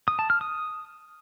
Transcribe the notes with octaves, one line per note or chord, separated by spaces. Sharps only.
D#6
A5
F6
D#6